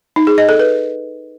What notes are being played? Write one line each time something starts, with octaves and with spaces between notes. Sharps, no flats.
D#4
G#4
D#5
A4
B4